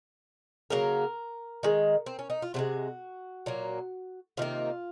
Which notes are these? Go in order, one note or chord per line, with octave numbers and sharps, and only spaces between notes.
C#3 F#3 A#3 A#4
D#3 G#3
C4
C#4
D#4
F4
C3 F3 G#3 F#4
A#2 F#3 A#3
C3 D#3 A#3 F4